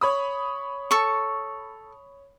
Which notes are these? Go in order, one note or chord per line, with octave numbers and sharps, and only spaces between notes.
C#5 B5 D#6
A4 C#6